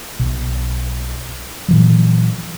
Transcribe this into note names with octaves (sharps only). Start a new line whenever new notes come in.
B1
A#2 E3 F#3